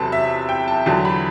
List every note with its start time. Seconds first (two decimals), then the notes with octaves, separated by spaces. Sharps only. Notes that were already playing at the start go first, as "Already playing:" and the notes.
Already playing: E2 C3 F#3 A4 B4 A5
0.12 E5
0.49 G5
0.68 A5
0.86 E2 D3 F#3 A5
1.05 B5